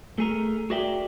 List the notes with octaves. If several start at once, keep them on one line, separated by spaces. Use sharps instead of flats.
A3 G#4 A#4
F#4 G#4 A#4 D5 E5 G5